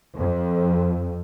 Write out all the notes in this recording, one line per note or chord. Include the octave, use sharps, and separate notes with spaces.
F2